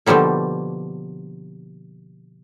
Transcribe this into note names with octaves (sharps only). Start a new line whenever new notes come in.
B2 D3 F3 G3 A#3